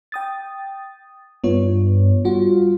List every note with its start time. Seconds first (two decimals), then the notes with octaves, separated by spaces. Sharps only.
0.12 G5 D#6 A6
1.44 G2 B3 F4 C#5
2.25 G3 F4 F#4